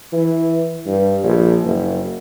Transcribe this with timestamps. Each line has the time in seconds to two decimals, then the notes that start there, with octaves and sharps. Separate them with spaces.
0.13 E3
0.86 G2
1.24 A#1
1.63 F#1